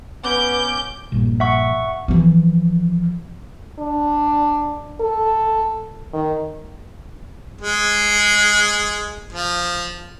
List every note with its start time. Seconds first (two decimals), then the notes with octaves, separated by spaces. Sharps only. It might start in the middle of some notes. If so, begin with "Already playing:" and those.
0.24 B3 C#4 D6 G6
1.12 A#1 G2 A#2
1.40 E5 F#5 C#6
2.08 E3 F3
3.79 D4
5.01 A4
6.13 D#3
7.61 G#3
9.33 F3